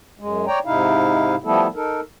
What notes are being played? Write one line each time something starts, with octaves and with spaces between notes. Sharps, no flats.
F#2 G#3
C#5 D5 G5 A#5
G#2 C3 D#4 E4 F5
F3 G3 A3 B3 E4 A4
D#4 A4 A#4